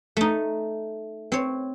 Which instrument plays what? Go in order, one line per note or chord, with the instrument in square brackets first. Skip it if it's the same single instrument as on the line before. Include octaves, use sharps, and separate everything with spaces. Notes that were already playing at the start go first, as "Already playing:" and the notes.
[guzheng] A3 D#4
C4 C#5